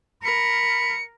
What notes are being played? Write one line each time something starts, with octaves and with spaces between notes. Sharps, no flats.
A#4 B5 C#7